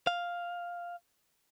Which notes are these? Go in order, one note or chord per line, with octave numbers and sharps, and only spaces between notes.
F5